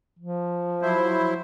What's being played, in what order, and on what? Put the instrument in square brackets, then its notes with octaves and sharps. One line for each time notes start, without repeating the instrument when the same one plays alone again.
[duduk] F3
[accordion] F#3 E4 C5